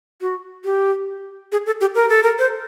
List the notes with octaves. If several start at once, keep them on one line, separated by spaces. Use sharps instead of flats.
F#4
G4
G#4
A4
G4
A#4
A4
A#4
C5